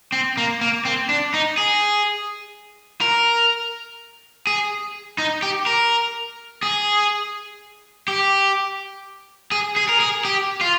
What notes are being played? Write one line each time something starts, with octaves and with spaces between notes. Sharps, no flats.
C4
A#3
A#3
C4
D4
D#4
G#4
A#4
G#4
D#4
G4
A#4
G#4
G4
G#4
G#4
A#4
G#4
G4
F4